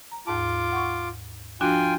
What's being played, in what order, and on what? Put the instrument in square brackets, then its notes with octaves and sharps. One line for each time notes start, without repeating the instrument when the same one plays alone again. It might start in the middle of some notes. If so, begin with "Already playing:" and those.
[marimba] A#5
[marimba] D#2 G#2 A5 [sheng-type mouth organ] F4 D6
[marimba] F#5 C#6
[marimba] F3 D4 F#4 [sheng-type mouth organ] F4 G5 G#5